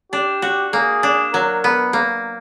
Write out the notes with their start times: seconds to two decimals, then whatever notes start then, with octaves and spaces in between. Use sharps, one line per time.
0.12 D4 G4
0.42 F#4
0.73 A#3 G#4
1.03 D4
1.34 F#3 A#4
1.64 B3
1.93 A#3